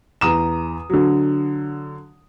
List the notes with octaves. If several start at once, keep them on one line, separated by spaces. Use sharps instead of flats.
E2 A#5 D#6 E7
D3 F#3